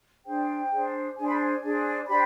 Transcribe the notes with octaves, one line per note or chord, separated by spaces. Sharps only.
D4 G#4 C5 G5
D4 G#4 C5
D4 G#4 C5 G#5
B5
G#5
D4 G#4 C5
D4 G4 C5 B5